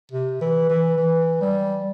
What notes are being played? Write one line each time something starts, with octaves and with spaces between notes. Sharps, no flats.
C3
E3
E3
E3
G3